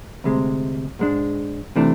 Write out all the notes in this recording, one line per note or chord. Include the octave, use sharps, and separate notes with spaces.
D2 C3 G#3
G#2 G#3 D4
C3 E3 A3 D4